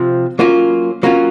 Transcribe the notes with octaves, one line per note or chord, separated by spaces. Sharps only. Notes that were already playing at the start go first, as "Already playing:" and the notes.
Already playing: C3 F3 C4 F4
F#3 A#3 C#4 F4
F#3 A#3 C#4 F4